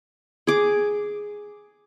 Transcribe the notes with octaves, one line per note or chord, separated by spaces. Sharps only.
G#4 D6